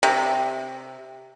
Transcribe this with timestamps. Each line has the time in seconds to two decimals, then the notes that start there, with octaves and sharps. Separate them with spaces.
0.03 C3